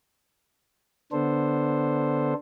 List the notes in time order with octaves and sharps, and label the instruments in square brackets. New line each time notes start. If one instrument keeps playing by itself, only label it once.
[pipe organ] D3 B3 D4 A4 C5